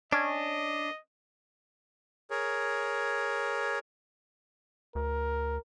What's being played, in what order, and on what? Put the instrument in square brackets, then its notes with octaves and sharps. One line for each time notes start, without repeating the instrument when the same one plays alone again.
[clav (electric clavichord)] C#4 [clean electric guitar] D4 [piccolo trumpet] D#5
[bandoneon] G#4 A#4 C#5
[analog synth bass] D2 [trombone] A#4